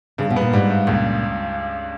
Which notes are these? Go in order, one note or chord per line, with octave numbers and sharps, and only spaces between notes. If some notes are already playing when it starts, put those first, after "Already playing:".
G2 C#3
B2
A#2 B3
G#2 G3
G2
C#2 A#2